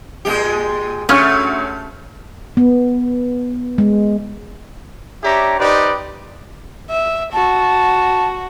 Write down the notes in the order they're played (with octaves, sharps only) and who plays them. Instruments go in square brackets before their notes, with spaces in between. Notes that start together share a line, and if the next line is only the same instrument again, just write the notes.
[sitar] A#2 G#3 G4
[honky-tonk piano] D2 C#5 F6 [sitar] A3 [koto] C#4
[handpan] B3
G#3
[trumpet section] D4 G4 C#5 E5 A#5
D#4 G4 B4 C5 D5
[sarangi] E5
[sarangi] F#4 [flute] A5